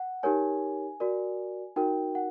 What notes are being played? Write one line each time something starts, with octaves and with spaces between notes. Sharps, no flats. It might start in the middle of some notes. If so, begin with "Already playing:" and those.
Already playing: F#5
D#4 G4 A#4 C#5 G#5
F#4 A#4 D5
D#4 F#4 A#4 G5
F#5